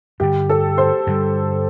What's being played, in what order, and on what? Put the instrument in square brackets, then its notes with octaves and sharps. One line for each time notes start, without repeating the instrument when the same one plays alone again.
[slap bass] G2 D3 G3 [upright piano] G4
[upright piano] A4
C5
[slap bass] G2 D3 G3